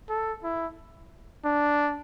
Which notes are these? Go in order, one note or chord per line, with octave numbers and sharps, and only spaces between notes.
A4
E4
D4